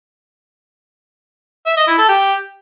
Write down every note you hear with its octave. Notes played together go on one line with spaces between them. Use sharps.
E5
D#5
E4
A4
G4